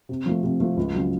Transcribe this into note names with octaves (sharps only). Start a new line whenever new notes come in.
C3
F3 A3
C3
F3 A3
C#2
C#3 F#3